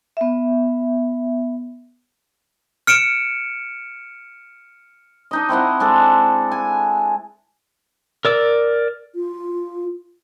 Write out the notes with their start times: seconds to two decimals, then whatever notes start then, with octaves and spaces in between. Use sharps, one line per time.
0.17 B3 E5
2.87 F6 C#7 D7 E7
5.31 D4 D#4 D#5
5.49 C4 E4 D#5 F#5
5.80 G#3 D4 A4
6.52 G#5
8.25 A#4 D5 E6
9.15 F4